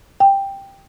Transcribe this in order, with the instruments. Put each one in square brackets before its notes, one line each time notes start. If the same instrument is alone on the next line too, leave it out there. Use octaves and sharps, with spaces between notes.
[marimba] G5